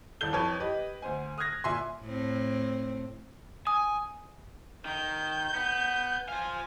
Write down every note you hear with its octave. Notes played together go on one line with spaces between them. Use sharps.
D#1 E4 A4 G6 G7
F2 E3 B4 C#5 A5 G#6
G4 B4 D#5
D2 C5 G#5
D#6 F6 F#6 G#6 A#6
A#2 E5 G#5 C6
A2 C4
G#5 D#6
D#3 G6
B3
C5 F5 G#5